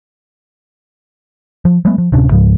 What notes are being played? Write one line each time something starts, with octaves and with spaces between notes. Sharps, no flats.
F3
F#3 G#3 A3 B3
F3
D1 C3 C#4 D4
C#2 G#2 F3